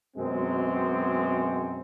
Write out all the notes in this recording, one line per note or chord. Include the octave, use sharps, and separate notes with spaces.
F#2 B2 G#3 C4